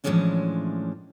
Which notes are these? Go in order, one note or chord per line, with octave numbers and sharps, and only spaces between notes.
A2 E3 F3 G#3 C#4 D4